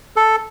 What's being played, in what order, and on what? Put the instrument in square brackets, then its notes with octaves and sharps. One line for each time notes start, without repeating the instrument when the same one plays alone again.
[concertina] A4